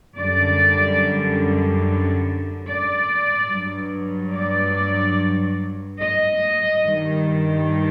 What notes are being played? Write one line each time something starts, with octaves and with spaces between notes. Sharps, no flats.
F#2 D3 G3 D5
D5
G2 F#3
D5
D#5
G2 D#3 G3